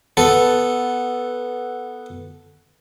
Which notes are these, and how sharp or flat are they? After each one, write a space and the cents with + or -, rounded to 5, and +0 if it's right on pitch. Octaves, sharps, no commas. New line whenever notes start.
B3 +0 A4 -5